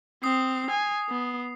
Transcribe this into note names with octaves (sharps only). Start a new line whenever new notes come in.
C4 D#6 C7
G#5
B3